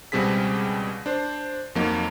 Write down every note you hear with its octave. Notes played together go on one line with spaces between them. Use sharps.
C#2 B2 G3 C4 G#4 B6
D4 C5
F2 F#3 A#3 D#4